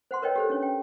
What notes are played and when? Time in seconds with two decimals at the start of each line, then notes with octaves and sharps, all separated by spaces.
0.11 C5 F#5 C6
0.22 A#4 B4 C#5 D#5 G5
0.36 G4 A4 C5
0.50 C#4 D4 C#5
0.63 G5